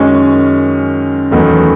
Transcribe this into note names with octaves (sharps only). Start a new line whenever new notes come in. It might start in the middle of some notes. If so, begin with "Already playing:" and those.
Already playing: F#2 D#3 G#3 C#4
E2 D#3 F#3 A3